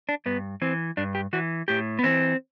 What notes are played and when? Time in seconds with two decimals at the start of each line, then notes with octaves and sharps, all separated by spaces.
0.09 D4
0.26 G2 B3
0.62 E3 C4
0.97 G2 D4
1.15 G4
1.33 E3 F#4
1.68 A2 G4
1.99 B3
2.04 E3 C4